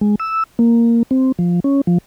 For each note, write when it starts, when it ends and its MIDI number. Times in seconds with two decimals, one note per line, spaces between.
0.01 0.15 56
0.20 0.43 88
0.59 1.03 58
1.11 1.32 60
1.39 1.60 53
1.64 1.81 61
1.87 1.98 53